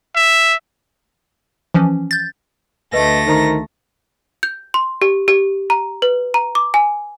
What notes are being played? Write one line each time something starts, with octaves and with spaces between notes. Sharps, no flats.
E5
E3 F3 C#4
G6 A6
D2 A3 B4 D#5 A#6
D#3 C5 A#5
G6
C6
G4
G4
A#5
B4
A#5
D6
G#5